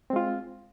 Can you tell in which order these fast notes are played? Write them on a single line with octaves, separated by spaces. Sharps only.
C4 G#3 F4